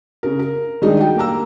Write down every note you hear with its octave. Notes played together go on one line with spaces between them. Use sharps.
C#3 A#4
A#4
D#3 G3 G#3 D4 D#4
F#4 G5
A#3 G4 A#4 A#5 E6